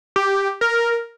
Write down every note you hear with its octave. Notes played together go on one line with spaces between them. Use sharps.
G4
A#4